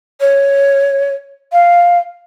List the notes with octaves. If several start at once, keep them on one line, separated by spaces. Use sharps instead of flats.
C#5
F5